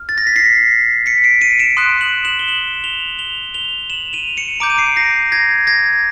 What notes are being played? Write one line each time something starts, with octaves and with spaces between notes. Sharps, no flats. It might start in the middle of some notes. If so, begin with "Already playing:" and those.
Already playing: F6
A6
A#6
B6
A#6 C7
B6 C#7
C7 D7
C#7 D#7
D7 E7
C6 D#6 F#6
E7 F#7
E7 F#7
G7
E7 F#7
F7 G7
F7 G7
F7 G7
E7 F#7
D#7 F7
C#7 D#7
A#5 D6 G6 D7
D#7
C7 D7
A#6 C7
G#6 A#6
G#6 A#6